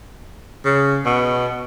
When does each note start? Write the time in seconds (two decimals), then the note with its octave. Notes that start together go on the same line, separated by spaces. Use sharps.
0.65 C#3
1.06 B2